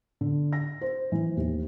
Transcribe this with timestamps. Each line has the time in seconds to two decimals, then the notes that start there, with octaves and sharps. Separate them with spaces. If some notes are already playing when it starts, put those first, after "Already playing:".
0.21 D3
0.53 A#6
0.81 C5
1.12 E3
1.37 D#2